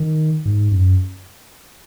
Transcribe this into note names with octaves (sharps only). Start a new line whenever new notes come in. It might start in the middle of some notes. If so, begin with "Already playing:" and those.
Already playing: D#3
G#2
F#2